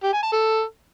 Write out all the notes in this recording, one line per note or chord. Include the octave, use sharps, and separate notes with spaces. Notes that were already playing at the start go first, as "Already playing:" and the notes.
G4
G#5
A5
A4